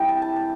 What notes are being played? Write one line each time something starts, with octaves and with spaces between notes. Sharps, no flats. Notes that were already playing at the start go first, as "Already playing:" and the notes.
Already playing: C3 E3 G3 G5
A5
A5
A5